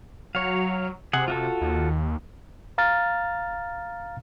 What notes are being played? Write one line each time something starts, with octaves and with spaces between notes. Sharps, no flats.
F#3 C#5 F5
C3 G#4 F#5
F4 F#4 A4
D#2
F5 A#5 F6 A6